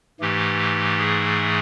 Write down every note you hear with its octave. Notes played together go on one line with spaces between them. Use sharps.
G#2 E3 A3 G4
G#4